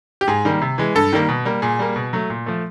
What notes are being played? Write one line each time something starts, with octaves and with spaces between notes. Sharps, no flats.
G4
G#2 G#4
D#3 G3 A#3
C3
E3 G#3
G2 A4
D#3 G3 A#3
B2
G3 A#3
A#2 G#4
G3 A#3
B2
F#3 A3
A#2
F3 A3